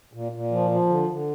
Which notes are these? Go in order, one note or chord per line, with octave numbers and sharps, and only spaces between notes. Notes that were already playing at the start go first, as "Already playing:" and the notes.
A#2
A#2
F3
F3
D3
D3